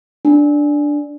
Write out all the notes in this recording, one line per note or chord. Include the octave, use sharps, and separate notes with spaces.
D4